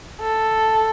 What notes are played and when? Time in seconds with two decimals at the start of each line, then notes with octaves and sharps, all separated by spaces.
0.21 A4